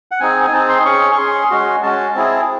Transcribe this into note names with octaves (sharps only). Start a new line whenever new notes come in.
F#5
C4 D#4 G#4 G#5
G#5
C4 D#4 G#4 A5
C6
C#4 G#4 C#6
C#6
C#4 G#4 C6
G#3 C#4 F#4
G#3 C#4 F#4 A5
C4 E4 G#4